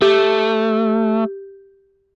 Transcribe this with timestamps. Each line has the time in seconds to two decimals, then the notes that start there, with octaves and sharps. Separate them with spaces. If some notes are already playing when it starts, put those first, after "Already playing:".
0.01 A3 G4